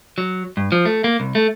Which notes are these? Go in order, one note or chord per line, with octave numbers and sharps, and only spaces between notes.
F#3
G2
F3
A3
A#3
C2
A3